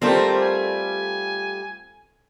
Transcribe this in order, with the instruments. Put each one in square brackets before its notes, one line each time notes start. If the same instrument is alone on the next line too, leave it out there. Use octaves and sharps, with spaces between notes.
[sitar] G3 A3 F4 [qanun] C4 A4 A#4 [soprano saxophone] C5
[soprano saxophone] G#5